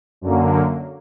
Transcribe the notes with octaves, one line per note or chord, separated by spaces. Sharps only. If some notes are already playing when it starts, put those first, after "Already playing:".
F#2 D3 F#3 A#3